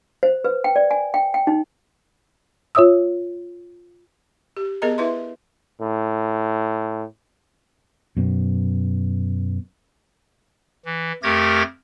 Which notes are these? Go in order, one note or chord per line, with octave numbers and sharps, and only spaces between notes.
C5
B4
G5
D5
G#5
G5
G5
D#4
F4 C#5 E5 D#6 E6
G4
B3 G#4 A#4 D#5 A#5
E4 B4 E5 C6
A2
F#2 B2
E3
F2 A3 G4 A#4 G#6 A#6